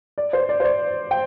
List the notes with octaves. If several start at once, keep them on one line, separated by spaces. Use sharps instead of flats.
D5
C5
D5
C5
D5
G5